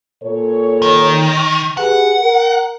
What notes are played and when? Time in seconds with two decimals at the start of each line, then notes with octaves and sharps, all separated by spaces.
0.23 A#2 A4 C#5
0.82 D#3
1.77 G4 G#4 B4 F#5
2.19 A#4